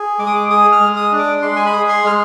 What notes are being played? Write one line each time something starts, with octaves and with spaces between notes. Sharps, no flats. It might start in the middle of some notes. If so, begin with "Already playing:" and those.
Already playing: G#4
G#3 D6
D#6
D6
G#4 D#6
F6
G#3
D#6
D4
D6
G#3 C6
G#5
B5
G#4
C6
G#3 F6